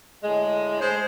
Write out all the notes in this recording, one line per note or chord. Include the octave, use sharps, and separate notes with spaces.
A2 D3 G#3
G#3 C5